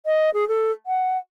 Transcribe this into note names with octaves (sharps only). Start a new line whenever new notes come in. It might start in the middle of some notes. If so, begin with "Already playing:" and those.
D#5
G#4
A4
F#5